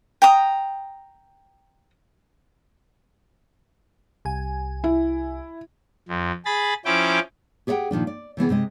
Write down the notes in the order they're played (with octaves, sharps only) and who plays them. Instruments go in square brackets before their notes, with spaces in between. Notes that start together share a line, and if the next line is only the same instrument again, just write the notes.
[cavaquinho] G5 A#5 D#6
[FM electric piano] C2 G#5
[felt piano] E4
[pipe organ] F2
G#4 B5 A6
F3 C#4 E4 G5 D6
[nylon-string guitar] G4 G#4 C#5 E5 F#5 G5
A#2 D#3 F3 D4
D5
C3 E3 B3 G#4
C3 G#3 D#5